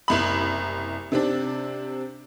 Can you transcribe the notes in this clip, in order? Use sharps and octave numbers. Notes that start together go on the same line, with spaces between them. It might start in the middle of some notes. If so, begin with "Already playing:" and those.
F#1 C2 B5
C3 C4 D4